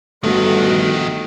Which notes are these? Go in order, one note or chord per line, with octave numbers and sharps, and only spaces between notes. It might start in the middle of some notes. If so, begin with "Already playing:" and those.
G1 D#3 F3 A3 F#4 A4